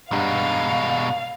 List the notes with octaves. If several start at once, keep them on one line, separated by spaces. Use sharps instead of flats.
G2 B2 G#3 F5 F#5 A#5